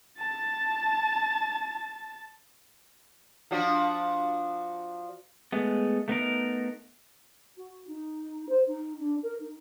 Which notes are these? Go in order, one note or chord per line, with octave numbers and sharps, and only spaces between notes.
A5 A6
F3 D4 F#4
G#3 A3 B3
A3 B3 D#4 A#4
F#4
D#4
C5
D#4
D4
A#4
D#4